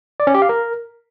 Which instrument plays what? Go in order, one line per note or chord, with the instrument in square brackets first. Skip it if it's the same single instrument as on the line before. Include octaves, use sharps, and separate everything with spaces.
[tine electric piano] D5
C#4
G4
F5
A#4